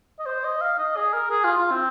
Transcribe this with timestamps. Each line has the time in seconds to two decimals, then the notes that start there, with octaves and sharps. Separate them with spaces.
0.19 D#5
0.26 C5
0.45 D#5
0.61 F5
0.78 D#5
0.96 G#4
1.13 A#4
1.31 G#4
1.44 F4
1.58 F4
1.71 C4